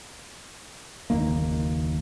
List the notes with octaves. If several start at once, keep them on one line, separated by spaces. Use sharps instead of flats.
F#1 D#2 D#3 A#3